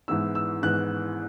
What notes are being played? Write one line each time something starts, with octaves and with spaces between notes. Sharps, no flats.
G#2 E3 B3 E4 E6
E6
G#2 E3 B3 E4 F#6